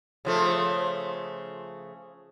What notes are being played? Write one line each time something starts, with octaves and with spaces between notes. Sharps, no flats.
C#3 F3 A3